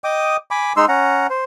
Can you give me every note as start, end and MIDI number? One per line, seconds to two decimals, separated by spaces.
0.04 0.37 75
0.04 0.37 79
0.04 0.37 86
0.04 0.37 87
0.51 0.73 80
0.51 0.73 83
0.51 0.73 86
0.77 0.85 56
0.77 0.85 63
0.77 0.85 84
0.77 0.85 88
0.88 1.27 61
0.88 1.27 78
0.88 1.27 82
1.30 1.44 72